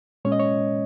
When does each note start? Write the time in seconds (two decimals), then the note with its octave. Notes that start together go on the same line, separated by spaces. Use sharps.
0.25 A#2 G#3 C#4 C#5
0.32 D#5
0.40 C#5